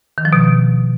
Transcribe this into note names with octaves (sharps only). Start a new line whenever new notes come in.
D#3
F3
B2